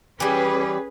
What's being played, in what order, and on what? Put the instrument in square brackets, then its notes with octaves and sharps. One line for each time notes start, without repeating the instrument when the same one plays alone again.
[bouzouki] E3 G3 [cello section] C#4 G#4 B4